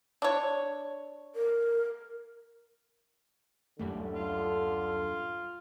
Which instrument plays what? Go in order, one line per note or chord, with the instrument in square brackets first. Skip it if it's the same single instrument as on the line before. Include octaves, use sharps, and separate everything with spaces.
[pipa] D4 C#5
[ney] A#4
[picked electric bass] D1 F#2 G3 [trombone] D3 [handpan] A3
[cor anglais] F4